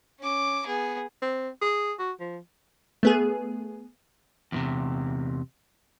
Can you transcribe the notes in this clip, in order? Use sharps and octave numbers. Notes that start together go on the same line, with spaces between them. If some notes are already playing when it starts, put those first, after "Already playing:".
C#4 D6
B3 G#4
C4
G#4
F#4
F3
A3 B3 G#4
E2 A2 C3